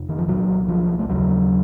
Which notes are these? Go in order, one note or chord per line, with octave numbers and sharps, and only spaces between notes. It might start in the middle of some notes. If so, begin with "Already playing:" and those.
Already playing: F2 C3
D#3
F3
C2 A#2 F#3
F3
A3
D#2 C#3 F#3